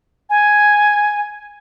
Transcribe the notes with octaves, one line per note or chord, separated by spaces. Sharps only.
G#5